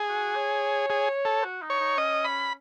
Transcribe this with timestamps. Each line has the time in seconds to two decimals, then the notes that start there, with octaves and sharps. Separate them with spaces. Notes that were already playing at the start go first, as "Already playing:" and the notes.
Already playing: G#4
0.09 F#4
0.35 C#5
0.90 G#4
1.25 A4
1.43 F#4
1.62 D#4
1.70 C#5
1.79 D#4
1.97 C#4 D#5
2.25 B5